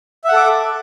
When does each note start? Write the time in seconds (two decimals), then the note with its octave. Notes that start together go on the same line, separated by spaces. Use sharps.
0.24 E5
0.28 F#5
0.32 A4
0.36 D6